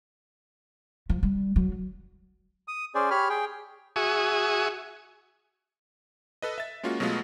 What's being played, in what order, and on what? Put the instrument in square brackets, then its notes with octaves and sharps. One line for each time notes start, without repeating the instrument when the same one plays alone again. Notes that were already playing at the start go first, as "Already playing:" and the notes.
[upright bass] F3
G3
F#3
[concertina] D#6
C#4 G#4 C5 D5
G4 C#5 B5 F6
G#4 G5
[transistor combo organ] F#4 G#4 E5 G#5 C#6 D#6
[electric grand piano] A4 B4 D#5
E5 A6
G#3 A#3 C#4 F4 F#4
B2 F#3 G#3 A3 B3 F4